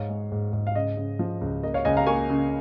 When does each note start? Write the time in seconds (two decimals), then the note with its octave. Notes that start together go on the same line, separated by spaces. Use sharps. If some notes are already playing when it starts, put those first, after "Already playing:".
Already playing: G#2 C#5 F5
0.09 G#3
0.32 G#2
0.53 G#2
0.67 F5
0.75 C#3 D#5
0.97 C#3
1.19 F3
1.41 C#2
1.63 A#3 D#5
1.74 C#5 F5
1.85 C#2 D#5 G#5
1.97 F5 A#5
2.07 A#3 G#5 C#6
2.30 C#3